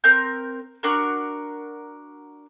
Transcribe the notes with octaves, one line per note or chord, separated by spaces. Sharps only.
C4 A#4 G6
D4 F#4 A#4